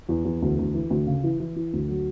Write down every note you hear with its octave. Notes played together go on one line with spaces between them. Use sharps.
E2
E2
D2
D2
E3
D2
C#3
E3
E3
E3
D2
F#3